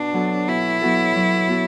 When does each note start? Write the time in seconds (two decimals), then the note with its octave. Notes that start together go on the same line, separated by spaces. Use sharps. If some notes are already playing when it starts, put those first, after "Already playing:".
Already playing: B2 D4
0.13 F#3 B3 F#4 A4
0.48 B2 E4
0.82 F#3 B3 F#4 A4
1.16 F#3
1.50 B3 F#4 A4